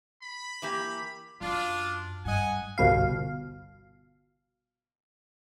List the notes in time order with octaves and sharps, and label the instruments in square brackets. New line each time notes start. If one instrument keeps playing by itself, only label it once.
[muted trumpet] B5
[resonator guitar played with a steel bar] E3 A#3 G4
[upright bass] F#2 [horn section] D4 F4
[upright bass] G2 [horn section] D#5 F#5 G#5
[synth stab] G1 C2 B2 F5